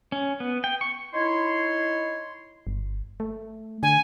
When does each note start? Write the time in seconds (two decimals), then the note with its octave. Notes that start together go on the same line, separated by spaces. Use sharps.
0.12 C#4
0.40 B3
0.64 G5
0.81 C#6
1.14 D#4 E4 C#5 C6
2.67 G1
3.20 A3
3.83 D3 G#5